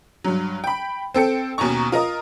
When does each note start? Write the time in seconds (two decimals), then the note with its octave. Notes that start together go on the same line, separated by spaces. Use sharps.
0.24 G2 F#3
0.64 G5 B5
1.14 C4 A4 G5 C#7
1.58 D#2 B2 C#4 A#5 C#6
1.92 F4 A#4 D#5 D#6